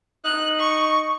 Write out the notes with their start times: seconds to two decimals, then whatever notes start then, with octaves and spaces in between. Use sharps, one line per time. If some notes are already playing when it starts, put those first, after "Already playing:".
0.25 D#4 F#6
0.59 C#6